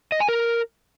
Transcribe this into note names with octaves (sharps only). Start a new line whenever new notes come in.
D#5
G#5
A#4